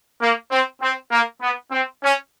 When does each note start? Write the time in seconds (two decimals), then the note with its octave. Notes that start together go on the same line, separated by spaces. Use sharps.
0.21 A#3
0.51 C4
0.81 C4
1.11 A#3
1.41 B3
1.71 C4
2.02 C#4